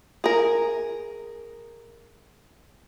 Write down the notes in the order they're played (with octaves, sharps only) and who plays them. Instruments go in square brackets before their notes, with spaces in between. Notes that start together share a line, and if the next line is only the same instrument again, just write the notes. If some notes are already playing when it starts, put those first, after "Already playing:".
[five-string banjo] G#4 A#4